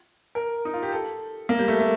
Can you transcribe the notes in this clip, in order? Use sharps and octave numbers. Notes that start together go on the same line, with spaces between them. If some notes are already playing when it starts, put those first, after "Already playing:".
A#4
D#4
F4
G4
A4
A#3
G3
A3
A3